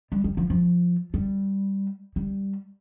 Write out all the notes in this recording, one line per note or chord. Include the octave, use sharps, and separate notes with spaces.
G3
G3
F3
F3
G3
G3